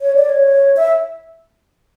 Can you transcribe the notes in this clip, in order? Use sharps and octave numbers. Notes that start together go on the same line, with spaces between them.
C#5
D5
C#5
E5